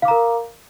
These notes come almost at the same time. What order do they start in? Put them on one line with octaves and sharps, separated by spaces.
F5 D6 A#5 A#4